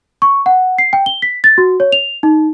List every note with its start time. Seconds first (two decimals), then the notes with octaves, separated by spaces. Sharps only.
0.22 C#6
0.46 F#5
0.78 C7
0.93 G5
1.06 G7
1.22 B6
1.44 A6
1.58 F#4
1.80 C#5
1.92 F7
2.23 D#4